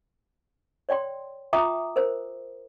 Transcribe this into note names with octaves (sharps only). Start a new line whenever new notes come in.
C#5 D5 G5 C6
F4 E5 G5 A#5 D6 D#6
A#4 C5